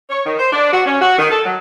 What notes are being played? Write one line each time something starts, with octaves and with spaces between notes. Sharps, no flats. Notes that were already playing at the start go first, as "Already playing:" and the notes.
C#5
D#3
C5
D4
F#4
C#4
F#4
D#3
A4
F#3